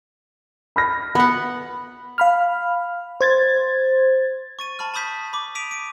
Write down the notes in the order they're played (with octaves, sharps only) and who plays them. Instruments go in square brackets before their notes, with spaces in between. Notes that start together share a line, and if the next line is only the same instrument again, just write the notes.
[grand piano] B5 F6 A#6
[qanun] B3 F#5 [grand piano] B5
[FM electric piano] F5 B5 F6
C5 G#6 A6
[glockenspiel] C#6 A6 D#7
A5 B5 C#6 F6
A5 B5 C#6 D#6 G6 B6
B5 D6
D#6 B6 D7 D#7 F7
D7